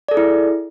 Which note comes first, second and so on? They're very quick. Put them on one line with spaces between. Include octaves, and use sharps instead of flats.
D5 A4 G#4 E4